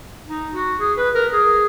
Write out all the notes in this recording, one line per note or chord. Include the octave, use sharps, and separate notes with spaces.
D#4
F#4
G#4
B4
A#4
G#4